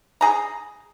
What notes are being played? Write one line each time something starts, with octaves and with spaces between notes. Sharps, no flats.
G#4 A#5